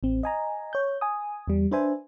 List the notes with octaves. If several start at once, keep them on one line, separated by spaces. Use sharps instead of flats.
A1 C4
D#5 G#5 A#5
C#5 G6
G#5 D#6
E2 G3
D4 B4 C5 E5 G#5